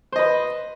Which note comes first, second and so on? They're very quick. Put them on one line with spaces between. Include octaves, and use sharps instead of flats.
C5 D#5 B4